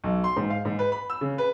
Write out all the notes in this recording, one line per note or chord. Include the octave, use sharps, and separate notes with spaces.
B1
C6
G#2
F5
G#2
B4
B5
E6
C#3
B4